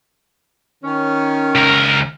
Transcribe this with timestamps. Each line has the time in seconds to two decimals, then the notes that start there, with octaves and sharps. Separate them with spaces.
0.84 D#3 C#4
1.55 C#2 A#4